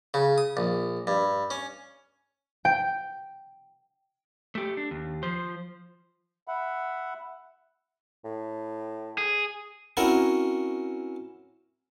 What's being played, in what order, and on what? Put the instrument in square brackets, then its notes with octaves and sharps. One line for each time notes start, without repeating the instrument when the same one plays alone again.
[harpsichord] C#3
D#6
A#1
G2
C#4
[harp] G5
[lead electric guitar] A3 G4
D4
D#2
F3 C5
[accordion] E5 F#5 B5
[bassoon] A2
[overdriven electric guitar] G#4
[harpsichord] C4 C#4 E4 F#4 A#4 C#5